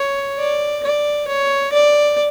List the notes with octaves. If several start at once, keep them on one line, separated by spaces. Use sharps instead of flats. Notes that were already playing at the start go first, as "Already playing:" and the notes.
Already playing: C#5
D5
D5
C#5
D5